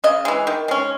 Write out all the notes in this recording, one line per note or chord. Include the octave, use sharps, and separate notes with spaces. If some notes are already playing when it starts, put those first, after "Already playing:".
C#3 D#5
E3 G#3
D#3
G#3 C#4